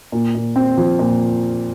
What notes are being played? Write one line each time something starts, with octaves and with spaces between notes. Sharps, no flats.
A#2
A#2
C4
F3
A#2